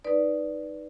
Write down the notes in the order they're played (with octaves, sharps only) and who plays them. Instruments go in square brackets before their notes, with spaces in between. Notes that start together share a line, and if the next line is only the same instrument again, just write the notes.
[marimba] D#4 B4 D5